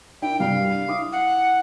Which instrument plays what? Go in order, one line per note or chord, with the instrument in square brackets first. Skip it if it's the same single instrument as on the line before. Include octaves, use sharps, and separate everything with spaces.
[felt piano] D4 E4 A#4 [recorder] G5
[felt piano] C2 G2 C3 [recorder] F5
[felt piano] E4 D6 D#6
[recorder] F#5